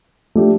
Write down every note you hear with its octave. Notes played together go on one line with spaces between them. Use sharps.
F3 A3 D4 G4